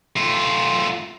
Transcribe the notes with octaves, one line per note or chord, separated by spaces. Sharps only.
A3 F4